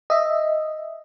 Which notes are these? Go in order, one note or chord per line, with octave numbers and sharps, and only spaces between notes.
D#5 E5